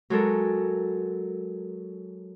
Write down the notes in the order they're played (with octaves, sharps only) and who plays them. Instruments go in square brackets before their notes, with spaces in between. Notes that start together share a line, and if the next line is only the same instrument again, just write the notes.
[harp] F#3 G#3 A4 A#4